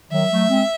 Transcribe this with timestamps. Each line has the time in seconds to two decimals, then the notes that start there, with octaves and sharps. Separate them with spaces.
0.11 D#3 F#3 E5
0.31 F#3 A3
0.49 G#3 C4